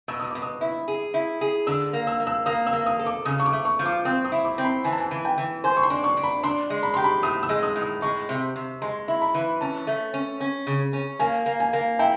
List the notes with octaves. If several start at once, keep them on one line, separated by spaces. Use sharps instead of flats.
B2 E6
D#6
B2 D6
D#6
E4
G#4
E4
G#4
D3 E6
A#3
E6
A#3
E6
A#3 D#6
E6
A#3
D#6
A4
D6
C#3 D#6
C#6
D6
A3
C#6
F3
D6
C4 D#6
D#6
E4
D6
C4
B5
E3 G#5
A5
G#5
E3
G5
E3
C5 G#5
C#6
C6
D4
C#6
D4
B5
D4 C6
G#3
B5
G4 C6
B5
A2 D#6
E6
G#3
D#6
A2
D#6
G#3 C#6
C3
C3
G#3 C6
E4
B5
E3
C#4 A5
A3
C#4
C#4
C#3
C#4
A#3 G#5
A#3
G#5
A#3
E4 G5